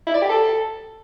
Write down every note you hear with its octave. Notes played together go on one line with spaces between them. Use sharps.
E4
D5
G4
A4